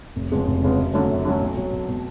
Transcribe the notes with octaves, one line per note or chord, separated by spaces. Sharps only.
F1
F2 C#3 G#3 B3
F1
F2 C#3 G#3 B3
F#2
D3 F#3 A3 C#4
F#2
D3 F#3 A3 C#4
B1
B2 F#3
B1
B2 F#3